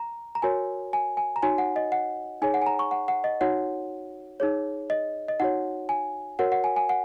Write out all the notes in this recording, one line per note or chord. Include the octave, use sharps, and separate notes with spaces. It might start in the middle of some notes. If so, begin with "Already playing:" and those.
Already playing: A#5
A#5
F#4 A#4 C#5 G#5
G#5
G#5
A#5
D#4 F#4 C#5 G#5
F#5
D#5
F#5
D#4 G#4 C#5 G#5
F#5
G#5
A#5
C#6
F#5
F#5
D#5
D#4 F#4 C#5 F#5
D#4 G#4 C#5
D#5
D#5
D#4 F#4 C#5 F#5
G#5
F#4 A#4 C#5 F#5
F#5
G#5
G#5
F#5